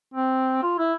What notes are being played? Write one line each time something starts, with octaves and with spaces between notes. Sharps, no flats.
C4
F4
E4